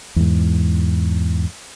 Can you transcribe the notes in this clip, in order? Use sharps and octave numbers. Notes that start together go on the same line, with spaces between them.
E2 G#2